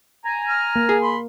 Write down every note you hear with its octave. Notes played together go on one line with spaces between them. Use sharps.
G#5 A#5
F6
A#3
G#4
B5 C6